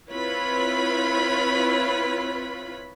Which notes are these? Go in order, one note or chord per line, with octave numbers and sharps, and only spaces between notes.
C4 E4 F4 B4 C#5 B5